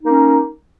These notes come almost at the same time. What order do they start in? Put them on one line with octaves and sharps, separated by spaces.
D#4 A#3 C#4